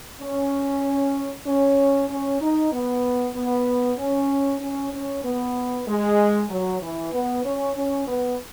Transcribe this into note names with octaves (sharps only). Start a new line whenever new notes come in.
C#4
C#4
C#4
D#4
B3
B3
C#4
C#4
C#4
B3
G#3
F#3
E3
B3
C#4
C#4
B3